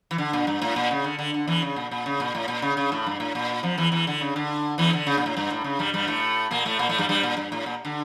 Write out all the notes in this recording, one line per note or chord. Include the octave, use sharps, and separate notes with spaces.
E3
D3
A#2
G2
A2
A#2
C#3
D3
D3
D3
E2 E3
C#3
A#2
A#2
C#3
A#2
A2
A#2
C#3
C#3
A2
G2
A2
A#2
F2 F3
E2 E3
E2 E3
D3
C#3
D3
E2 E3
D3
C#3
A#2
A2
G2
A2
C#3
G2 G3
G2 G3
A2 A3
A#2 A#3
A2 A3
A#2 A#3
A2 A3
G2 G3
G2 G3
A#2
G2
A2
A#2
D3